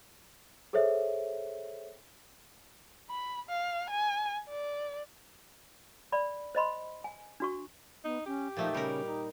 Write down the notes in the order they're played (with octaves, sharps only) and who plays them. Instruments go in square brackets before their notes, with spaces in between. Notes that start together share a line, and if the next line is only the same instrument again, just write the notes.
[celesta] G#4 A4 C5 C#5 E5
[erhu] B5
F5
G#5
D5
[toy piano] D5 B5
C5 D#5 B5 C6
G#5
D4 F#4 C#6
[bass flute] B3 [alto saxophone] D#4
[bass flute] C#4 [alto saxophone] G4
[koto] A#2 A3 D#4 [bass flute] F3
[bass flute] C#3 [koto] G3 A#4
[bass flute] D#4